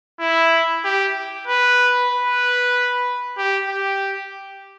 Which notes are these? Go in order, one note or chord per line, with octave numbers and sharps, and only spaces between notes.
E4
G4
B4
B4
G4
G4